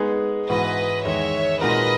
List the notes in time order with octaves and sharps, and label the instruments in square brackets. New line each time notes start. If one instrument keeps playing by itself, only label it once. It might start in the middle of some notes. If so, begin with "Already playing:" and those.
Already playing: [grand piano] G#3 B3 D#4 G#4
[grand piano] G#2 E3 B3 F#4 [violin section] B4 D#5
[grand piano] E2 D#3 G#3 [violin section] C#5 E5
[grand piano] A#2 G#3 D#4 F#4 A#4 [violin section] B4 D#5